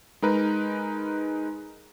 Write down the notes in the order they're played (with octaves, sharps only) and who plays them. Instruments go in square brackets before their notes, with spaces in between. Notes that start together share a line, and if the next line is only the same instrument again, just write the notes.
[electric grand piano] G#3 D#4 A#4 B4